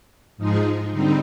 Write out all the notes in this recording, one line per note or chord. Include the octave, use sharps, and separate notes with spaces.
G#2 F3 G#3 D#4 G#4
D3 G3 C4 D#4